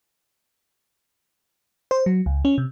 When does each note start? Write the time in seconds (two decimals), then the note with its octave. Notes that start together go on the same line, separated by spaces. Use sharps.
1.91 C5
2.06 F#3
2.26 C#2
2.45 C#4
2.58 C3